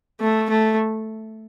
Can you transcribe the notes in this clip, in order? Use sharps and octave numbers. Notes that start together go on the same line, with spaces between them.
A3
A3